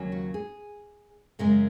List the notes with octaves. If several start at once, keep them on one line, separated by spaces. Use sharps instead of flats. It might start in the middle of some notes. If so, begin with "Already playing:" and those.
Already playing: D#2 C#3 F#3 A#3 C#4
F#4
G#4
F#2 C#3 G#3 C#4 A#4